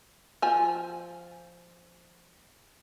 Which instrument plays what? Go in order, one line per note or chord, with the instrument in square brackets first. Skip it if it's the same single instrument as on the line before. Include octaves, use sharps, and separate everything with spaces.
[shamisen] F3 G#5